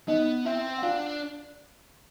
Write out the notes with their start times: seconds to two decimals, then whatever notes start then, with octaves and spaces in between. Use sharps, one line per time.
0.08 B3 D#4 D#5
0.45 C4 E4 E5
0.78 F#5
0.83 D4 F4 F5